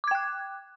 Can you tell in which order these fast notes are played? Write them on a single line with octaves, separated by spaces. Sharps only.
D6 G#6 G5 F#6